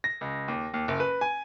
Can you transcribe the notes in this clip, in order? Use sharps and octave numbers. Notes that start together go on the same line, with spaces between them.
A#6
C#2
D#2
D#2
F#1
B4
G#5